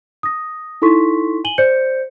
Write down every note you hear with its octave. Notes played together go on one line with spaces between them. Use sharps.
D#6 A#6
D#4 E4 A4 C6 C#6 B6
G#5 D#7 F#7 G7
C5 D5 G6 C#7